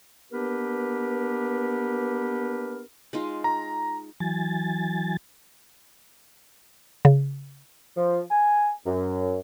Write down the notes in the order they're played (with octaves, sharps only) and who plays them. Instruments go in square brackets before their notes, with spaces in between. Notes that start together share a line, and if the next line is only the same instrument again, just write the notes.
[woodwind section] A#3 B3 D4 G4 A#4 B4
[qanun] G#3 D#4 F4
[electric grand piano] A#5
[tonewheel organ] E3 F#3 G#5 A6
[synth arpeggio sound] C#3
[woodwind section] F3
G#5
F#2